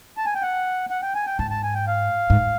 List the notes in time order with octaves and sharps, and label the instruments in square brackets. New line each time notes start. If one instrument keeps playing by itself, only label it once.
[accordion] A5
G#5
G5
F#5
F#5
G5
G#5
G5
[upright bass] G#2 [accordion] A5
[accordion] A5
G#5
G5
F5
[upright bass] G#2